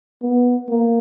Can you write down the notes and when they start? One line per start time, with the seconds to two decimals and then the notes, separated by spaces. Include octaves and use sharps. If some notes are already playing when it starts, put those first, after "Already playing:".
0.22 B3
0.69 A#3